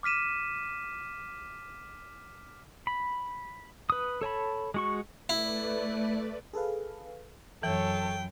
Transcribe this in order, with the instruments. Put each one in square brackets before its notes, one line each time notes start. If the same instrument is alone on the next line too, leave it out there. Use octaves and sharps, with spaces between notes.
[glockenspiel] D6 F6 B6 D#7 E7
[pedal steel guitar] B5
B4 D#6
A4 C#5 A5 B5
G#3 F#4 C#6
[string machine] A3 B4 D5 [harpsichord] E4
[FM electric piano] G#4 A4 B4 F5
[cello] F#2 [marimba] E3 [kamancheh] A4 C#5 [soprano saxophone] G5